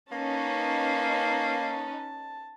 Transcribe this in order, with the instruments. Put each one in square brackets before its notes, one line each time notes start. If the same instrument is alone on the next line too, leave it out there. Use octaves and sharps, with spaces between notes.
[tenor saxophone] A#3 [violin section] C#4 D#4 B4 [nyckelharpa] A5